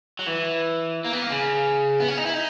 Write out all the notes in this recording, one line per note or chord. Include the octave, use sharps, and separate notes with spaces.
F#3
E3
A#3
B3
A#3
C#3
B3
C#4
D#4
E4
D#4